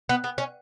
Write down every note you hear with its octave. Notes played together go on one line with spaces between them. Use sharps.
B3
B3
C#4